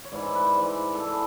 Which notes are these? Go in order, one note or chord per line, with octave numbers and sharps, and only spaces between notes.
C#5
G#2 E3 D5
C5
B4
C5
G#2 E3 D5
A4
E3 G#4